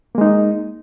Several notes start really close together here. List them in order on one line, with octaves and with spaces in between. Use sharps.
A#3 G#3 D#4